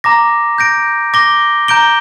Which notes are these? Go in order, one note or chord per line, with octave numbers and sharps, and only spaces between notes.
A#5 D6 A#6
G6 A#6 D7
D6 A#6 G7
A#5 G6 D7 G7